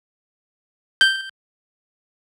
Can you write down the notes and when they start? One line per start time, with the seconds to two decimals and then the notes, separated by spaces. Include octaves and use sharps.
1.01 G6